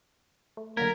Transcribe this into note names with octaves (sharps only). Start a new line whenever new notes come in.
A3
D3 F#3 A#3 A#4 G#6 B6